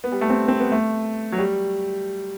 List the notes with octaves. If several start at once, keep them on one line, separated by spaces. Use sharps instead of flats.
B3
G3
A3
C4
C4
B3
A3
F#3
G3